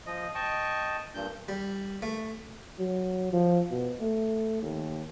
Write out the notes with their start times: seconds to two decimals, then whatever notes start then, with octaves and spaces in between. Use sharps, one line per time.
0.06 F3 D#5
0.35 D#5 G5 A5 C#6
1.14 G2 A#2 G6
1.48 G3
2.02 A3
2.79 F#3
3.33 F3
3.70 B2
4.01 A3
4.63 D#2